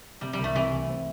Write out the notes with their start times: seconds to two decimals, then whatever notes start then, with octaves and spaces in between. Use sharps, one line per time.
0.21 C3 G3
0.33 G3
0.39 C2 A3
0.55 C3 E3
0.72 C2
0.89 C4